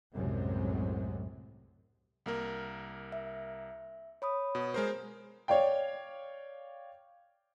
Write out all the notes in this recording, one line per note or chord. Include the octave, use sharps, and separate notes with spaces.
C2 F#2 A2 C3 F#3 G#3
C2 A#3 A#4
E5
C#5 B5 D#6
B2
G#3 A#4 C5
C#5 D5 F5 G5